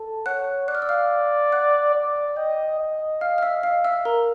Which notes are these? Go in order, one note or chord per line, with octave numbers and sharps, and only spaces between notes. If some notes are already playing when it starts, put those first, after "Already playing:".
Already playing: A4
C#5 F#5 F#6
D5 F#6
F6
E6
F5 F6
F#5 F#6
D5
D#5 G5 G6
D#5
F5 F6
F6
E5 E6
F5 F6
E5 E6
A#4 A#5